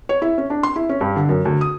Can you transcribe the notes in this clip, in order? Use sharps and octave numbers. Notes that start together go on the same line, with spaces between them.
C#5
E4
C#4
D4
C6
E4
C#4
G2
D3
F#2
D2
D#6